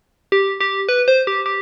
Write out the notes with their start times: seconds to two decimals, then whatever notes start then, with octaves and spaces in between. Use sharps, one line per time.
0.32 G4
0.61 G4
0.89 B4
1.08 C5
1.27 G4
1.46 G4